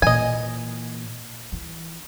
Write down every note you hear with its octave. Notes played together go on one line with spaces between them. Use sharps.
A#2 E3 D#5 G#5
E3